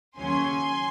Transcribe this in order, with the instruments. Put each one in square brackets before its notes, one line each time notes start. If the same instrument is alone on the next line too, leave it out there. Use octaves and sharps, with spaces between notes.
[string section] D#2 C#3 F#3 C#4 G#5 C6